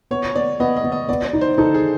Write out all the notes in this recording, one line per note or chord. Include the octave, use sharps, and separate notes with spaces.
B3 C#5
C#5
B3 D5
B3 D#5
D#5
B3
D#5
B3 D5
D5
D#4
C5
D#4 A4
G#4